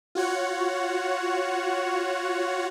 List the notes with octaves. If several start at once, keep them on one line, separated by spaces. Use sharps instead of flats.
F4 F#4 C#5 F#5